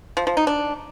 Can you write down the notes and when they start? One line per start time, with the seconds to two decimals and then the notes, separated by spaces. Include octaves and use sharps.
0.17 F3
0.27 F3
0.37 D#4
0.47 D4